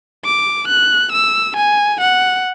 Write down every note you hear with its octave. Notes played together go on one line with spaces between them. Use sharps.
D6
F#6
E6
G#5
F#5